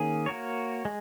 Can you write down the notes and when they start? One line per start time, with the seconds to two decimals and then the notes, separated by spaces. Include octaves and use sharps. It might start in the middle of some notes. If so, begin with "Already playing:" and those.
Already playing: D#3 A#3 C#4 G#4
0.26 A#3 F#4 A#4 C#5
0.85 G#3